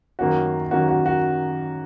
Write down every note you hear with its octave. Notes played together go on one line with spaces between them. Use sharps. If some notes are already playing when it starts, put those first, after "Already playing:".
F#2 D#3 A#3 C#4 F#4
F#2 D#3 A#3 C#4 F#4
F#4
F#4